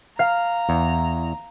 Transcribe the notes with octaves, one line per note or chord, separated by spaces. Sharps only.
F5 A#5
E2